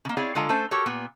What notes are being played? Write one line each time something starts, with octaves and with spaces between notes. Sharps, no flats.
C#3 A#3
C4 E4 G#4 C#5 D5 F5
D3 G#3 F4 A4 F5 A#5
A3 C#4 A4 C5
F#4 G4 A4 A#4 C#5
A#2 B3